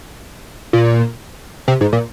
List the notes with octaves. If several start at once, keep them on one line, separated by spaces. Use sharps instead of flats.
A#2
C3
G#2
A#2